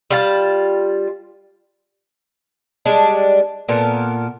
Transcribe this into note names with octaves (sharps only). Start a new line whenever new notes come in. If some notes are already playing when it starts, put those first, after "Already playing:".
G3 F4 A5
G3 G#3 D4
A#2 B3 A4 A#4